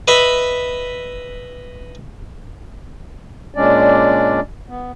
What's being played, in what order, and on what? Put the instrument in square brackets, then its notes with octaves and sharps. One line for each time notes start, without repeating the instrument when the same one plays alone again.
[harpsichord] B4 D#5 E5 B5
[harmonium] A#2 G#3 C#4 D4 D5
B3